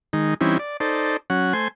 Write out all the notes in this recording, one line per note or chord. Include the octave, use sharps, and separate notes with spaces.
D#3 G#3 D#4
E3 G3 C4 C#4 D#4 E4
D5
D#4 A4 C5 D5
F#3 C#4 F#5
A3 C5 G#5 C6